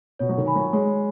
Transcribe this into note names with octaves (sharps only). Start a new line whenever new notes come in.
B2 C#5
F#3
D#3
G#5 B5
F#3
G#3 C#5